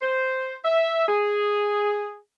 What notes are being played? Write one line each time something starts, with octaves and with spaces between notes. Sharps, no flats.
C5
E5
G#4